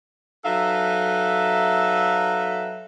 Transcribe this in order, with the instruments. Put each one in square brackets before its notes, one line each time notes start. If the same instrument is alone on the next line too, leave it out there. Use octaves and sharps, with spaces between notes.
[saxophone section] F#3 D#4 A4 B4 E5 F5